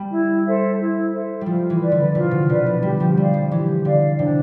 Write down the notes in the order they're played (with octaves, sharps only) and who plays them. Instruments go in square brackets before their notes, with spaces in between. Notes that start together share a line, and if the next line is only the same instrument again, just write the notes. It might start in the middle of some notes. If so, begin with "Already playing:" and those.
Already playing: [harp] G3
[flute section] E4
A4 C5 E5
E4
A4 C5 E5
[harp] G3
[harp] F3 [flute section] F4
[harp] E3
[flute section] B4 D5
[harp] D3
[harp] C3 [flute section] F4
[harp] B2
[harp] D3 [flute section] B4 D5
[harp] F3
[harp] G3 [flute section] G4
[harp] F3
[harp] G3 [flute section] D5 F5
[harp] F3
[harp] E3 [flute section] G4
[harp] D3 [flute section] D5 F5
[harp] C3 [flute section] D4